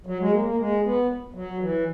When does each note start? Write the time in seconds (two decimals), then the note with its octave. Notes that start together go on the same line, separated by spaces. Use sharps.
0.06 F#3
0.20 G#3
0.32 A#3
0.45 A#3
0.58 G#3
0.84 B3
1.34 F#3
1.61 E3